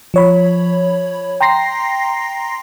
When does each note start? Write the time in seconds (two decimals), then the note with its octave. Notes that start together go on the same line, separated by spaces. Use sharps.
0.14 F3 C#5 B5
1.41 G5 A#5 C6 A#6 C7